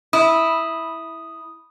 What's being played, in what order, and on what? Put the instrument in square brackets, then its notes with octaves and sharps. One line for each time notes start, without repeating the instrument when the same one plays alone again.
[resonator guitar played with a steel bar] E4 [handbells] D#6